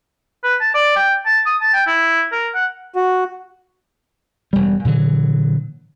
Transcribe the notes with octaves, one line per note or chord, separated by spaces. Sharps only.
B4
A5
D5
G5
A5
D#6
A5
G5
E4
A#4
F#5
F#4
E1 G3
A#2 D3 E3 F#3